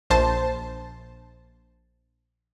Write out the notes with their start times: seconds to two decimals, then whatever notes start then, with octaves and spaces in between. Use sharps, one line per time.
0.10 A#1 C5 A5